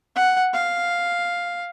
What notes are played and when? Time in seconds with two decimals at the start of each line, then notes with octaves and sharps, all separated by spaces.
0.16 F#5
0.53 F5